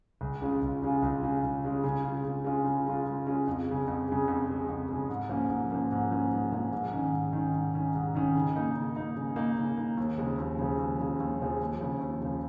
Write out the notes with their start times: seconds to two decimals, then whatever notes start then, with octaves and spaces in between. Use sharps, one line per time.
0.21 C#2
0.42 C#3 G#3 C#4 F4
0.62 C#2
0.82 C#3 G#3 C#4 F4
1.02 C#2
1.23 C#3 G#3 C#4 F4
1.43 C#2
1.64 C#3 G#3 C#4 F4
1.84 C#3
2.05 G#3 C#4 F4
2.25 C#3
2.44 G#3 C#4 F4
2.65 C#3
2.86 G#3 C#4 F4
3.06 C#3
3.27 G#3 C#4 F4
3.47 F2
3.68 C#3 G#3
3.88 F2
4.08 C#3 G#3
4.28 F2
4.48 C#3 G#3
4.69 F2
4.89 C#3 G#3
5.09 G#2
5.29 F3 A#3 C#4
5.50 G#2
5.71 F3 A#3 C#4
5.91 G#2
6.11 F3 A#3 C#4
6.32 G#2
6.52 F3 A#3 C#4
6.72 G#2
6.93 D#3 C#4
7.13 G#2
7.33 D#3 C#4
7.54 G#2
7.74 D#3 C#4
7.95 G#2
8.15 D#3 C#4
8.35 C#3
8.56 A#3 D#4
8.75 C#3
8.96 A#3 D#4
9.17 C#3
9.36 A#3 D#4
9.58 C#3
9.77 A#3 D#4
9.97 D#2
10.18 C#3 F3 G#3
10.38 D#2
10.59 C#3 F3 G#3
10.79 D#2
11.00 C#3 F3 G#3
11.20 D#2
11.40 C#3 F3 G#3
11.61 D#2
11.81 C#3 F3
12.01 D#2
12.21 C#3 F3